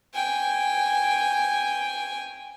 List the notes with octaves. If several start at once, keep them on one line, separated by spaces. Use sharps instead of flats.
G5 G#5